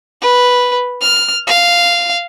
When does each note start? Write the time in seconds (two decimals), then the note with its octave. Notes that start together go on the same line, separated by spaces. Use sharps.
0.22 B4
1.02 F6
1.47 F5